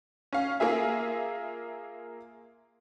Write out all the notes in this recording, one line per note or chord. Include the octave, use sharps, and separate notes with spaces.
C#4 F5
A#3 F4 G#4 E5